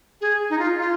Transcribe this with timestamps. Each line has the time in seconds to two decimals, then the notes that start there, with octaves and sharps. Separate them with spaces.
0.21 G#4
0.50 D#4
0.59 F4
0.78 F4